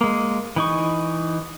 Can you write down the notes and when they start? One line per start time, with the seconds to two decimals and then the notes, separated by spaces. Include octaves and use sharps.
0.01 G#3 A#3
0.56 E3 D#4 C#6